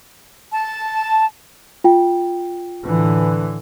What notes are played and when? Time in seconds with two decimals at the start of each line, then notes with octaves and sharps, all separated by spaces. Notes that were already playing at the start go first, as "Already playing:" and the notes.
0.52 A5
1.84 F4 G5
2.85 A2 D3 E3